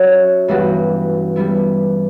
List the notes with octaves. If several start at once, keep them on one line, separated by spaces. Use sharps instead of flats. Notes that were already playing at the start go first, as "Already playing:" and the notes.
Already playing: F#3 C#4 F#4 C#5 E5
G2 E3 G3 B3 F#4
G3 B3 E4